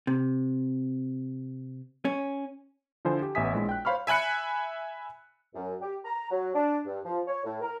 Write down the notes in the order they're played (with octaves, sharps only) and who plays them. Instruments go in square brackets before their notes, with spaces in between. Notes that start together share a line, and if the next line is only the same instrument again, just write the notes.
[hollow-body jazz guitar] C3
C#4
[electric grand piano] D3 F3 E4 C5 G#5
G4
A1 B3 E5 G#5 D#6 B6
A#1 G#3 E4
G5 F#6
C5 C#5 F5 B5 C#6 F6
[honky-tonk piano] E5 G#5 B5 F#6 C#7
[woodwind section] F#2
G4
A#5
F#3
D4
G2
F3
C#5
A2
A#4